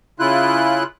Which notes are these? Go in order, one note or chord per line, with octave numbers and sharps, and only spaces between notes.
C#3 E4 F4 F#6